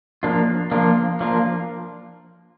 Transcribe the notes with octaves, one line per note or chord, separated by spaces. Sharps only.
F3 A#3 D4 F4
F3 A#3 D4 F4
F3 A#3 D4 F4